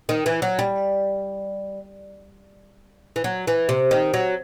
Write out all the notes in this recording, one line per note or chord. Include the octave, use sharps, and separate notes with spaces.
D#3
E3
F#3
G3
E3
F#3
E3
C3
D#3
F#3